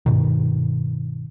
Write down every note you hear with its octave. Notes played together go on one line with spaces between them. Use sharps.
G2 B2 D#3